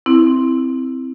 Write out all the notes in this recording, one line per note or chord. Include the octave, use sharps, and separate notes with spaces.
C4 E4